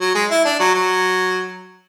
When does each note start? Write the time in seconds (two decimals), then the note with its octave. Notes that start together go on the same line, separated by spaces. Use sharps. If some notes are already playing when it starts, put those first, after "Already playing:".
0.01 F#3
0.15 G#3
0.31 E4
0.45 D4
0.60 F#3
0.75 F#3